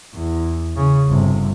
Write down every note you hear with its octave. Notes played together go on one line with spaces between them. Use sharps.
E2
C#3
G1 C3